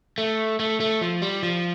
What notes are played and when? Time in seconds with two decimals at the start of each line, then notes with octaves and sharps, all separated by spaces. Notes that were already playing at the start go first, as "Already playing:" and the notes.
0.18 A3
0.60 A3
0.80 A3
1.01 F3
1.22 G3
1.43 F3